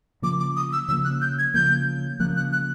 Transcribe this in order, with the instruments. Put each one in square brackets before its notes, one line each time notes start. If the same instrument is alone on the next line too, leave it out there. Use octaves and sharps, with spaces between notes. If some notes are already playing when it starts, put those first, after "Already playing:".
[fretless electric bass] C#3 F3 A#3 [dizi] D6
[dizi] D6
D#6
E6
[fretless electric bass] C#3 F3 A#3 [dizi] E6
[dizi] F#6
G6
G#6
[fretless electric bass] C#3 F3 A#3 [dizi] G6
[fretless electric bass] C#3 F3 A#3 [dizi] F#6
[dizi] F#6
F#6